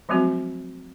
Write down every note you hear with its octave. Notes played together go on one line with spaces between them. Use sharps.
F3 F#3 G#3 A3 C4 F#4